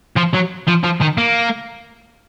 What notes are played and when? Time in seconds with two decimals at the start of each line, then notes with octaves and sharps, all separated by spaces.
0.16 F3
0.33 F#3
0.67 F3
0.83 F3
1.01 D#3
1.18 A#3